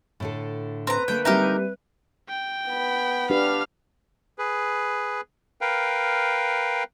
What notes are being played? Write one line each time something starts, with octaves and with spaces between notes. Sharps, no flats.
A2 D3 A4
C4 B4 A#5
D3 A3 A#3 G5
G3 C4 D#4 G4 A#4 E5
G5
B3 B5
D4 G4 B4 F5 F6
G#4 B4
A#4 B4 F5 G5